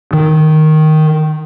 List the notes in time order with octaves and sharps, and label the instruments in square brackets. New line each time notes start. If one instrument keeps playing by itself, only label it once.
[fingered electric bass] D#3